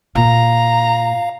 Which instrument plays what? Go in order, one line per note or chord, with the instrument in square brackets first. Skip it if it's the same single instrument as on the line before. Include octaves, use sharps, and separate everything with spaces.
[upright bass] A#2 [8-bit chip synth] F5 [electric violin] A#5